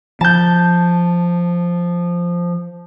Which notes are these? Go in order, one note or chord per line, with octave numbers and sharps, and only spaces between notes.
F3 A5 G6